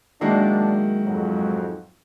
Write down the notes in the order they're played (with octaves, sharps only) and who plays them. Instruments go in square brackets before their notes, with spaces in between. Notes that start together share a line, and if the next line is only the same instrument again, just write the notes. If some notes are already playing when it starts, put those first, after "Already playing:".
[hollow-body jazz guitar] F#2 G#3 A#3 [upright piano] D#3 E4 F#4 [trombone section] D4
[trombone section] F2 G#2 F#3